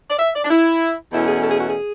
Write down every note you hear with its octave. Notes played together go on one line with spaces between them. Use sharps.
D5
E5
D5
D4
E4
E2 B2 A3 C#4 E4
G#4
A4
G#4
F#4
G#4